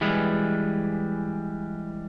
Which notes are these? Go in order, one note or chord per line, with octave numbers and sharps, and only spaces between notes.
E3 G3 G#3 B4